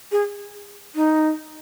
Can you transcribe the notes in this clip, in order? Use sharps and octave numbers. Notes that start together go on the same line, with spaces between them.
G#4
D#4